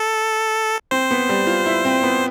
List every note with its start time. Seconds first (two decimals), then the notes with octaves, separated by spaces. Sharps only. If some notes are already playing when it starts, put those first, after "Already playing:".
Already playing: A4
0.91 C4 C5
1.11 B3
1.29 G3
1.47 F4
1.66 E4
1.85 C4
2.03 B3